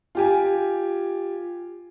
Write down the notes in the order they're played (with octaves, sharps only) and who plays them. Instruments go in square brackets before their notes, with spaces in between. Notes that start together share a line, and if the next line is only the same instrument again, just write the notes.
[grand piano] F4 G4 G#5